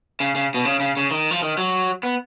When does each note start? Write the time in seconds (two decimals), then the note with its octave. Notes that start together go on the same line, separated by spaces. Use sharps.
0.20 C#3
0.35 C#3
0.54 B2
0.65 C#3
0.80 C#3
0.97 C#3
1.11 D#3
1.31 F3
1.42 D#3
1.58 F#3
2.03 B3